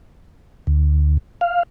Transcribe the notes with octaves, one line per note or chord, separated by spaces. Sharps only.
D2
F5